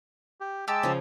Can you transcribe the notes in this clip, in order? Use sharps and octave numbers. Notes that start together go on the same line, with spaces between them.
G4
G#3 G4 A5 E6
C#3 F3